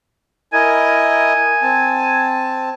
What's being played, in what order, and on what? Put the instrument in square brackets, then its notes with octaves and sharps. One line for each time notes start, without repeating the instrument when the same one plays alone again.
[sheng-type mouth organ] E4 A#4 D#5 [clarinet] G#5
[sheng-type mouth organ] C4 A5